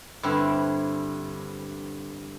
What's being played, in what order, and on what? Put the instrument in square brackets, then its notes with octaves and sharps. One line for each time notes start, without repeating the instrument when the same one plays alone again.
[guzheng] G2 D3 C4 D4 E4